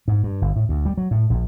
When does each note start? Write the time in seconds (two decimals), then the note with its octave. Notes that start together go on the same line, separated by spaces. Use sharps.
0.08 G#2
0.23 G2
0.42 G1
0.56 A2
0.69 D2
0.85 G3
0.98 F#3
1.11 A2
1.30 A#1